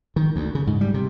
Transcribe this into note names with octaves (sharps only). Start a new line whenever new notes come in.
D#3
D2
C#3
G#2
G3
C3